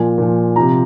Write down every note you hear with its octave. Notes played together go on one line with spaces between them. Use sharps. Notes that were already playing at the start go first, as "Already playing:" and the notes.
Already playing: A#2 F3 G#5
A#2 F3
C3 F3 A#5